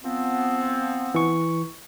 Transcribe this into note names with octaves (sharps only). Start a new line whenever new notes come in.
F3 B3 C4
E3 C#6